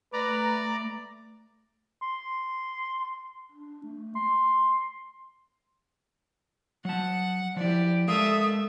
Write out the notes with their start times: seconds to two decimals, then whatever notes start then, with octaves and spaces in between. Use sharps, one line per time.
0.13 A3 B4 D5 A#5
2.02 C6
3.52 D4
3.84 A3
4.15 C6
6.85 F#3 F#5 A5
7.57 F3 E4 G4 D5
8.08 G#3 A3 A#4 E5 F5 D#6